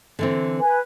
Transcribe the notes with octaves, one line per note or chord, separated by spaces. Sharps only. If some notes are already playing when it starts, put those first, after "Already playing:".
D3 E3 C4
B4 G#5